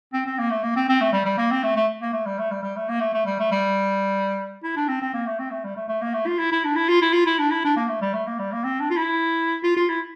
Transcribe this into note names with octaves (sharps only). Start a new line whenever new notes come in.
C4
C4
A#3
A3
A#3
C4
C4
A3
G3
G3
A#3
C4
A3
A3
A#3
A3
G3
A3
G3
G3
A3
A#3
A3
A3
G3
A3
G3
E4
D4
C4
C4
A#3
A3
C4
A3
G3
A3
A3
A#3
A3
F4
E4
E4
D4
E4
F4
E4
F4
E4
D4
E4
D4
A#3
A3
G3
A3
A#3
G3
A#3
C4
D4
F4
E4
F4
F4
E4